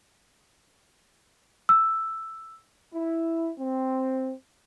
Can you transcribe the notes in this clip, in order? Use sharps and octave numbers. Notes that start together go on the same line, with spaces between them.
E6
E4
C4